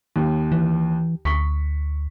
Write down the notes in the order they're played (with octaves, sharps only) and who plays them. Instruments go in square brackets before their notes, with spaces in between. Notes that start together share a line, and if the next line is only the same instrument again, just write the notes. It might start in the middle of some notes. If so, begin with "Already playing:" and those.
[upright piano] D#2
[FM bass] E3
[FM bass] D2 [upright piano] C#6 B6